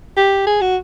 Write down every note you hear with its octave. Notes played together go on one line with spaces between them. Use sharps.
G4
G#4
F#4